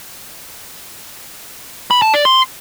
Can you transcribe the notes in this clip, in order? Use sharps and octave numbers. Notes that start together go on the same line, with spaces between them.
B5
A5
D5
C6